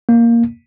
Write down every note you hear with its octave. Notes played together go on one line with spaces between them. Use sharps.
A#3